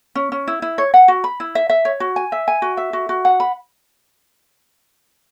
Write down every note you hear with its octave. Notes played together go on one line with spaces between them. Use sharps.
C#4
C#4
E4
E4
C#5
F#5
F#4
B5
E4
E5
E5
C#5
F#4
G#5
E5
G#5
F#4
E5
F#4
F#4
F#5
B5